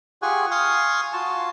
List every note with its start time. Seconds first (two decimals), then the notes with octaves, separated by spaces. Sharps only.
0.22 F4 G4 G#4 F#5 G#5 C#6
0.51 F5 G#5 C6 C#6 D#6
1.13 F4 F#4 A5